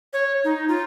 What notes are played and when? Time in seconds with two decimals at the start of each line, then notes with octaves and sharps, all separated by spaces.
0.13 C#5
0.44 D#4
0.68 F4